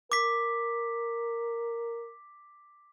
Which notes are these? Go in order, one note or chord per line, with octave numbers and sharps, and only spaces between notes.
A#4 D6 B6